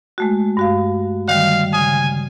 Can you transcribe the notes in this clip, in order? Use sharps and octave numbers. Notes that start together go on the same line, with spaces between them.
G#3 A3 F#4
G2 F#4 F5
D3 D#3 G3 F5
C#3 G#5 D#6